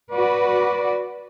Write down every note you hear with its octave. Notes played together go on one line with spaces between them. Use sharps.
F#4 B4 D5